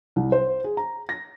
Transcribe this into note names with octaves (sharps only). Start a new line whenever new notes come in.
C2
C5
G#4
A#5
A#6